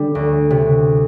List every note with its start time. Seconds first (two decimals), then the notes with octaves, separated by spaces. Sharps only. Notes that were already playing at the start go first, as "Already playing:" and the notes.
Already playing: D3 G3
0.15 D2
0.51 C3